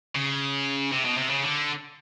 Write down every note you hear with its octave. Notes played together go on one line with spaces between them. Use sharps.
C#3
C3
B2
C3
C#3
D3